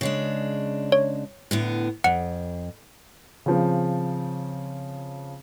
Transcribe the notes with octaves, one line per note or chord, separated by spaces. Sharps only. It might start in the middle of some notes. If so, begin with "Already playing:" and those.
C#3 G#3 D4
C#5
A2 D3 B3
F2 F#5
C#3 F3 C4